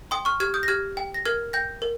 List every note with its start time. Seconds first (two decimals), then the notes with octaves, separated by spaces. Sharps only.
0.11 G5 C6 D#6
0.25 C#6 F6
0.40 G4 F6 G#6
0.54 D#6 G6
0.63 A#6
0.68 G4 F6 G#6
0.97 G5
1.14 A#6
1.25 A#4 F6 G#6
1.53 G5 G6 A#6
1.82 A#4